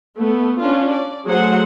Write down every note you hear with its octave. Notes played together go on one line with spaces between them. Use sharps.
A3 B3
C#4 D4 F4
D5
F#3 A3 G#4 C5 F#5